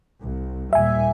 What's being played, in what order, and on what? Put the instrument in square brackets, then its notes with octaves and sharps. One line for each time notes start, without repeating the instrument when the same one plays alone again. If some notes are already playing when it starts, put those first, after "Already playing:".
[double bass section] C2
[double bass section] D#2 A#2 G3 [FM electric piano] E5 G#5